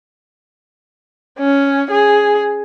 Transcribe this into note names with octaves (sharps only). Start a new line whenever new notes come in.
C#4
G#4